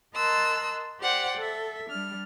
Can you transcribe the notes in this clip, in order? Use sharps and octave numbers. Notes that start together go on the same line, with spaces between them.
A#4 D#5 A5 C6 E6 F#6
G4 C5 D5 F#5 G5
A4 E5
G3 D4 F6